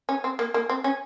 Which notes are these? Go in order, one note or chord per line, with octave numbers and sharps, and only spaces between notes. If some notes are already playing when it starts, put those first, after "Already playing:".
C#4
C4
A#3
A#3
C4
C#4